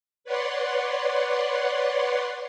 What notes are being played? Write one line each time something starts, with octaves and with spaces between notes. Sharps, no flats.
B4 C#5 D5 F#5 C6